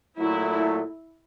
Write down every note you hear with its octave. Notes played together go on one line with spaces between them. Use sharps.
A#2 F#3 A3 E4